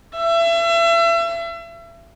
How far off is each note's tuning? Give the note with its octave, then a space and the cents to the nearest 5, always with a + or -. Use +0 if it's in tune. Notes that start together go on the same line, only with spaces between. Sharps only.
E5 +35